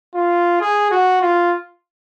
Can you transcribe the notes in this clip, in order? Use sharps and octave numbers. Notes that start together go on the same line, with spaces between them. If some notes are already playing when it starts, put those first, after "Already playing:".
F4
G#4
F#4
F4